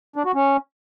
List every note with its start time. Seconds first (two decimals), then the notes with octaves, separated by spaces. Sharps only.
0.16 D4
0.25 F#4
0.34 C#4